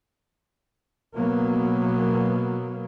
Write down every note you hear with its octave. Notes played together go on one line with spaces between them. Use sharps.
B2 F#3 A#3 B3